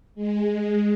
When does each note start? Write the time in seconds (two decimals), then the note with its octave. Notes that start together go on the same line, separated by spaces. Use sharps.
0.15 G#3